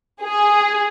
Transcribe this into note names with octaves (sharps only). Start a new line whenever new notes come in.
G#4